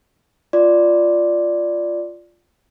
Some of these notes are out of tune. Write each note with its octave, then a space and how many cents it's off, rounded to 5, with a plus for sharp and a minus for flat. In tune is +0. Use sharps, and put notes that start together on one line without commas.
F4 -5 D5 +0 C6 +0